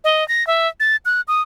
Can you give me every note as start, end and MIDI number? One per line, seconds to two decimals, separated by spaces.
0.04 0.26 75
0.28 0.46 94
0.47 0.68 76
0.80 0.96 93
1.05 1.21 90
1.28 1.42 87